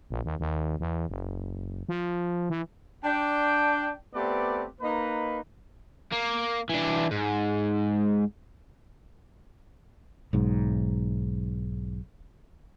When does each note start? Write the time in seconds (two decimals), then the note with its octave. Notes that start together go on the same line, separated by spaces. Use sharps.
0.10 A#1
0.25 D#2
0.40 D#2
0.80 E2
1.09 F#1
1.89 F3
2.50 E3
3.04 D4 G5
4.14 A3 B3 C4 G4 B4 D5
4.81 A#3 D#4 B4
6.12 A#3
6.69 E3 D4
7.11 G#2
10.33 B1 G#2